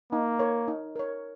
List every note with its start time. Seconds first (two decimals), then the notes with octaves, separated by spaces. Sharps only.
0.12 A#3 D#4
0.39 A#4 C#5
0.68 D#4
0.96 A#4 C#5